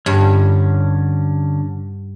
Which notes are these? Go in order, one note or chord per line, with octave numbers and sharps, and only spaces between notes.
G2 D3 C#4